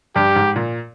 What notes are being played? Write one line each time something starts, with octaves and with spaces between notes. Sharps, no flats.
G2 G4
G#2
A#2